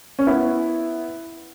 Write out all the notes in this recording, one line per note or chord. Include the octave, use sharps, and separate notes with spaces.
C#4
B3 E4